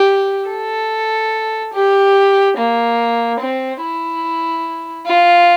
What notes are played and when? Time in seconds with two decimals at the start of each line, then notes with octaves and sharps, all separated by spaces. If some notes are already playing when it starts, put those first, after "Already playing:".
Already playing: G4
0.50 A4
1.74 G4
2.58 A#3
3.40 C4
3.82 E4
5.06 F4